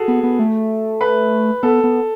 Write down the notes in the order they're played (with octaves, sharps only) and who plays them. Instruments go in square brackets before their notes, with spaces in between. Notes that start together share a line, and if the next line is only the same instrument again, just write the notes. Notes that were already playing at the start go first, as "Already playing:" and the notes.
Already playing: [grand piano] F#4 G#4 A4
[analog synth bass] B3
B3
A3
[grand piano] B4
[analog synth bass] B3 [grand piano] A4
[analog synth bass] B3